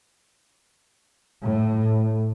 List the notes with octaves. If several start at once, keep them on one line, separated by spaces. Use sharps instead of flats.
A2